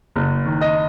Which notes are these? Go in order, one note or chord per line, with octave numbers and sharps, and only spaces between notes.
F#1
D#3
D#5